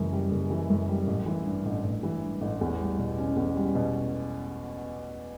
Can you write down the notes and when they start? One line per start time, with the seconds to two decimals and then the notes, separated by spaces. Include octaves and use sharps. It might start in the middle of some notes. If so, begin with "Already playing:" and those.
Already playing: F#1 F#2 E3
0.12 G3
0.31 F#1
0.50 E3
0.70 F#2
0.89 G3
1.07 A1
1.26 E3
1.46 G2
1.65 A1
1.84 A1
2.03 E3
2.22 G2
2.41 A1
2.61 E2
2.80 G3
2.98 B2
3.18 C#4
3.36 E2
3.56 G3
3.75 B2